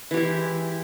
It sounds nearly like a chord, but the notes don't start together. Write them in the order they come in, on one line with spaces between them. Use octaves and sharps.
E3 G4 E4 G#3